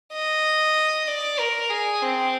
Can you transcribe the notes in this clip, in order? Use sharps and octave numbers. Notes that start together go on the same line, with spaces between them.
D#5
D5
A#4
G#4
C4